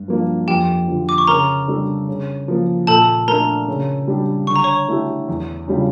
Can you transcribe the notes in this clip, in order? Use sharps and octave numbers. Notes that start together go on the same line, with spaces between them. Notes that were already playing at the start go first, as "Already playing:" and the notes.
Already playing: G2
F3 A#3 D4
F2 G4 G5
D3 F3
D6
C#6
C#3 A#4 A#5
G3 D4 A4
C#3
F3 A#3
A#2 A4 A5
A3 D4 A#4 A#5
C#3
G3 D4 G4
D3 C#6
A#5
C#5 C#6
A3 E4 G4
E2
C#3 G3 D4 F4